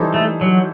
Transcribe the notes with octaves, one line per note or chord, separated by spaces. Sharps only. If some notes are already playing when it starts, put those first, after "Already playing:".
Already playing: E3 G3 D#4 A4 C5
A3
F#3